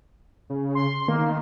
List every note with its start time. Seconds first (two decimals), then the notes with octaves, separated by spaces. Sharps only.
0.50 C#3
0.75 C6
1.08 D#3 A#3